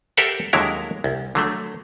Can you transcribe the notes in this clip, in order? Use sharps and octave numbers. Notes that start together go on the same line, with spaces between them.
G4 A4 A#4 C5 E5 F#5
D#2 D3 F#3 G#3 E4 A#4
C2
D3 F#3 A3